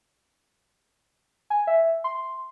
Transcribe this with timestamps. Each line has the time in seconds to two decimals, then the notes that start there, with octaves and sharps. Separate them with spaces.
1.50 G#5
1.67 E5
2.04 C6